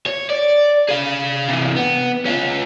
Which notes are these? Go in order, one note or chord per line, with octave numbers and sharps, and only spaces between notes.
C#5
D5
G#4 F5
C3 E3
B3
C#4 F4